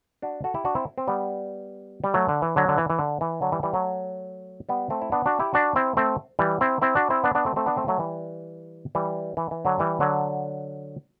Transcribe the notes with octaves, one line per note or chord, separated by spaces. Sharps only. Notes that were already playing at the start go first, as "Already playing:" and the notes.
D4 F#4
F#4 A4
E4 G4
D4 F#4
C4 E4
C4
G3 B3
G3
F#3 A3
D3
E3
D3 F#3
D3
E3
E3
D3
E3
D3 F#3
E3 G3
E3 G3
F#3 A3
G3 B3
A3 C4
E4
B3 D4
D4 F#4
E4 G4
D4 F#4
C4 E4
A3 C4
E3 G3
C4 E4
C4 E4
D4 F#4
C4 E4
B3 D4
B3 D4
A3 C4
A3 C4
B3 D4
A3 C4
F#3 A3
E3 G3
E3 G3
E3
E3
D3 F#3
E3 G3
D3 F#3